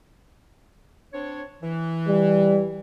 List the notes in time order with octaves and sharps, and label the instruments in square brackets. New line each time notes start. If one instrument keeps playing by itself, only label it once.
[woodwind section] C4 D4 C#5
E3
[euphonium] G3